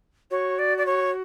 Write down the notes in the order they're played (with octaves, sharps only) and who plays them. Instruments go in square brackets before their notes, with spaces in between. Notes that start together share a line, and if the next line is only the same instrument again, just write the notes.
[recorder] F#4 [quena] C#5
[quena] D5
D5
C#5